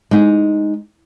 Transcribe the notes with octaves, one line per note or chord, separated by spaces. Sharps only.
G#3 D#4